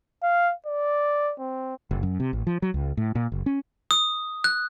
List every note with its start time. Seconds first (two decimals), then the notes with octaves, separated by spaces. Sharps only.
0.23 F5
0.66 D5
1.39 C4
1.91 F#1
2.03 F#2
2.20 C3
2.33 A1
2.47 F3
2.62 F#3
2.74 C#2
2.97 A2
3.15 A#2
3.32 F#1
3.46 C#4
3.91 D#6
4.44 F#6